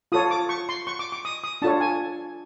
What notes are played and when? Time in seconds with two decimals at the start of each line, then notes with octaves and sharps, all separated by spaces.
0.12 F4 A4 C#5 D#6
0.30 D6
0.49 C#6
0.69 C6
0.87 C#6
0.99 D6
1.12 D6
1.25 D#6
1.44 D#6
1.62 D4 F4 A4 C#5 A5
1.80 G#5